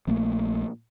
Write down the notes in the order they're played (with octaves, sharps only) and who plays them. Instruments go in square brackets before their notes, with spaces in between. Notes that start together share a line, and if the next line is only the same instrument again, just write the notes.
[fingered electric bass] A#1 A3 A#3